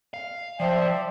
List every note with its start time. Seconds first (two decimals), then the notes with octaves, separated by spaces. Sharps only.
0.14 F5
0.60 F3 C5 D5 E5 G5